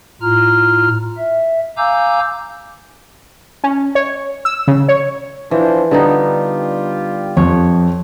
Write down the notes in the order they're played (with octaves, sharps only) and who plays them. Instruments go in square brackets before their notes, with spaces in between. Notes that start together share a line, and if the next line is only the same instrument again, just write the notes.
[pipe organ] A2 F4 A#5 F6
E5
F5 G#5 A#5 D6 E6 G6
[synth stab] C#4
C#5
E6
C#3
C#5
[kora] E3 [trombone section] F3 D4 C5
[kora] D3 B3 D#4 [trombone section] G3 F4 G4
[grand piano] F2 [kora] C#5